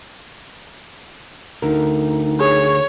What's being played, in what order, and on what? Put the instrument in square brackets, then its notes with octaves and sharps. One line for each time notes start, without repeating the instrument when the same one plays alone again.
[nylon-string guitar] D2 A#4 [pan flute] D#4
[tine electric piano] G#4 [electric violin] C#5